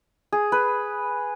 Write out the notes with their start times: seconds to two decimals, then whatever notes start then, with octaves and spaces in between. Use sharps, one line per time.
0.32 G#4
0.52 B4